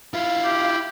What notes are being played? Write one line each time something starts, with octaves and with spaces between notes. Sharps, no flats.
E4 F4 F5
G4